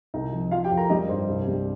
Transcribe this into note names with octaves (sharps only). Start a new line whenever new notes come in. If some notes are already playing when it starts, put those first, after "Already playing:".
C2 D#4 D#5
F3
F3 F4 F5
G4 G5
F2
A#4 A#5
G3 D#4 D#5
G2 C5
C2
G3